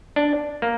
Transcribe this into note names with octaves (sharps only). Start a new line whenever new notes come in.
D4
A#3